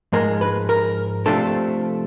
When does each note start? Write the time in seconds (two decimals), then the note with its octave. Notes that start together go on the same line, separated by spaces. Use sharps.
0.13 G#2 F3 G#3 A#4
0.41 B4
0.69 A#4
1.26 C3 F3 A3 D4 A4